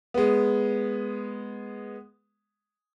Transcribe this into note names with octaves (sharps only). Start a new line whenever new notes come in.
G#3 B3